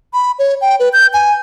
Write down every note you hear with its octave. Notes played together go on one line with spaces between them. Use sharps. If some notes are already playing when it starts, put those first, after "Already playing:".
B5
C#5
G5
B4
G6
G#5